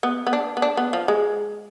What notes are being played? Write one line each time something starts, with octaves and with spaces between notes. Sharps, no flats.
B3
B3
D4
B3
D4
B3
F3
G#3